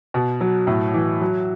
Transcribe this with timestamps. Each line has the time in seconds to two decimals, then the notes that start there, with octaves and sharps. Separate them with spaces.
0.14 B2
0.41 F#3
0.67 A2
0.94 E3
1.21 F#3